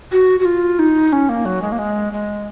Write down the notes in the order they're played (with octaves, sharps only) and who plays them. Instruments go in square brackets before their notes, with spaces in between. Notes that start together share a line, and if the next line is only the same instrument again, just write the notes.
[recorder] F#4
F#4
F4
D#4
C#4
A#3
F#3
G#3
A#3
G#3
G#3